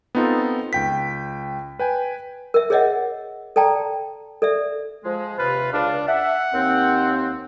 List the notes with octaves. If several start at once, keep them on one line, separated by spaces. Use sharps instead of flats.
B3 C4 D#4 F4 A4
C#2 G5 B6
B4 G5 G#5
A#4 E5
G#4 A#4 C#5 D#5 E5 F#5
A4 D5 G5 A5 A#5
A4 D5 E5
F3 G#3
D#2 C3 F4 B4
C#2 D4 F5
E5 F#5
D#2 C4